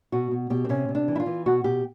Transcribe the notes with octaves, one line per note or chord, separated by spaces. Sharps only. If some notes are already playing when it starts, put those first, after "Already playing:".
B2 F#4
B2
B2 G4
C4
C3 C#4
C3
D4
E3
E4
F4
E3
B2 F#4
B2 G4